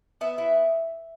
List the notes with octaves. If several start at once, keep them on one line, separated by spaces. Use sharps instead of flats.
B3 E5
E4